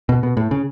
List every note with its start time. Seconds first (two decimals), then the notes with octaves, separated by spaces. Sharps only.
0.09 B2
0.23 B2
0.37 A2
0.51 C#3